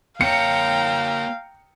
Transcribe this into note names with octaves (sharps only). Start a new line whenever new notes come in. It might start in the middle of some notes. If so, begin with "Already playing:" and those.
A#3 C#5 F5 G5 A#5 C#7